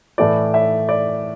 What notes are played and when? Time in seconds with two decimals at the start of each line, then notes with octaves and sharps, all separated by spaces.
0.18 A2 E3 A3 E4 D5
0.54 E5
0.89 D5